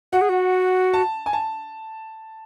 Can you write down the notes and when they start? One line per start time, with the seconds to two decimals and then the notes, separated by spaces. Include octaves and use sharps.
0.13 F#4 F#5
0.21 G#4
0.29 F#4
0.94 A5
1.26 G#5
1.33 A5